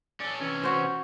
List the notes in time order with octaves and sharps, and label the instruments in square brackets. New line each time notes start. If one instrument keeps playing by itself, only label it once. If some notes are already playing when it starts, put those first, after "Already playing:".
[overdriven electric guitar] C#4 A4 [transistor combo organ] D5
[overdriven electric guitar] C3 E3 [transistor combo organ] C#4
[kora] F#4 C5